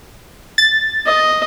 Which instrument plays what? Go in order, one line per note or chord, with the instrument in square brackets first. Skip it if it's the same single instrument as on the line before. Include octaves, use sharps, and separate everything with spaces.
[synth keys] A6
[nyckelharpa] D#5